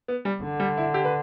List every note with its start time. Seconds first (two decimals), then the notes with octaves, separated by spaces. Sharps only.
0.08 B3
0.25 G3
0.42 D3
0.60 G3
0.78 E4
0.94 G4
1.05 B4